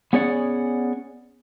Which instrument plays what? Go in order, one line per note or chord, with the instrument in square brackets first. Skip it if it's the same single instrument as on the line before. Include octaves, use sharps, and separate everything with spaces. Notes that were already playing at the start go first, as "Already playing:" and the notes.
[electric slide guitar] B3 C#4 G#4 C#5 D5 F#5